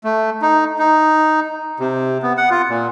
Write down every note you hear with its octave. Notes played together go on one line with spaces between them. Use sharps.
A3
D#4
D#4
C3
B3
F#5
F4
A#2